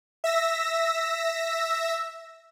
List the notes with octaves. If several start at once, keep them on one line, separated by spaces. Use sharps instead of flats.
E5 E6 A#6